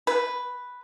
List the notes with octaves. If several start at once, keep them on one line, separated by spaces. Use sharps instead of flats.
B4